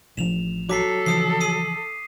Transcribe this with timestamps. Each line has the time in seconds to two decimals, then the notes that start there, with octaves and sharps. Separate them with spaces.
0.17 A1 F3 E7 F7
0.69 F#3 A4 D6 B6 C7
1.06 C#3 E3 F3 D#6 C7
1.40 D#6 C7 D#7